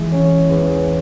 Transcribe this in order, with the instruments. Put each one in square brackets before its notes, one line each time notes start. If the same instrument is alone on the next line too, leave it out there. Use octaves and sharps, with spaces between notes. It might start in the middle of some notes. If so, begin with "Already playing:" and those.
Already playing: [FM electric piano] E3 [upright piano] G#3
[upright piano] C#4
E2